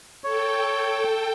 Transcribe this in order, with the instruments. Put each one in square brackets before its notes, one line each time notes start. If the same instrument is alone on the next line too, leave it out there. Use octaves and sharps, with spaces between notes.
[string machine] A4 G5 [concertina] C#5